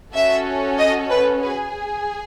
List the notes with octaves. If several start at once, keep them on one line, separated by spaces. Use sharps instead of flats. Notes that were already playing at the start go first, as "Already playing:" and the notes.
C#4 F#4 A4 E5
D#5
B4
G#4 B4